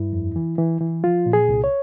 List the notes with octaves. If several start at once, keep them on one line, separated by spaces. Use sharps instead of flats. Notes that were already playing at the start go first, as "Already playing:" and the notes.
Already playing: G2 E4
F2
E3
E3
E3
F3 F4
A#2
G#4
C2
C#5